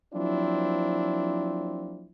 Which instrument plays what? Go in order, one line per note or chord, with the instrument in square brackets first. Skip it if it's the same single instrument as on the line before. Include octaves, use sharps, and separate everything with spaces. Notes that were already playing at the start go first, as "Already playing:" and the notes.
[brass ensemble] F3 F#3 A#3 C4 D4 E4